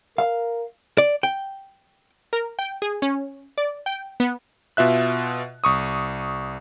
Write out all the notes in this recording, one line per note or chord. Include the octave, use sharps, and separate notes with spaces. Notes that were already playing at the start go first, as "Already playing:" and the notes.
A#4 F5
D5
G5
A#4
G5
G#4
C#4
D5
G5
B3
B2 F4 E5 F#6
C2 C#6 D#6